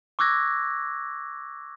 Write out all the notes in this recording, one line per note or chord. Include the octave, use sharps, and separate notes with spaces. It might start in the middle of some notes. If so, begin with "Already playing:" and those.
C#6 D6 E6 F#6 G#6 A#6